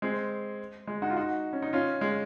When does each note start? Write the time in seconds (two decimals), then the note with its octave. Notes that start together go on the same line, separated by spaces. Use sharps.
0.02 G#3 C4
0.87 G#3
1.02 D#4 F#4
1.10 F4
1.17 D#4 F#4
1.53 C#4
1.62 D#4
1.73 C#4 F4
2.01 G#3